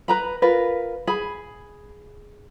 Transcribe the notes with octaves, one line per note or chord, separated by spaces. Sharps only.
B4 A#5 B5
F4 A#4 B4
G#4 B5